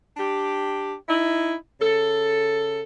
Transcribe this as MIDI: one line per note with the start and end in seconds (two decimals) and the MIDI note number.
0.17 0.93 62
0.17 0.93 67
1.08 1.54 63
1.08 1.54 64
1.80 2.81 49
1.80 2.81 69